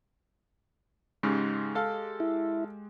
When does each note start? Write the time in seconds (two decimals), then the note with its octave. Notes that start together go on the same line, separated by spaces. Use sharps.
1.23 G#2 C#3 G#3 G4
1.75 A4 F5
2.20 E4